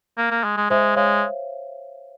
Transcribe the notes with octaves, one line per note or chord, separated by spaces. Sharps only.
A#3
A#3
G#3
G#3
G#3 C5 E5
G#3 C#5 F5